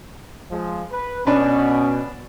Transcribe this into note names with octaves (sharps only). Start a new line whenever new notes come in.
F3 G#3
B4
B2 C#4 D4 B4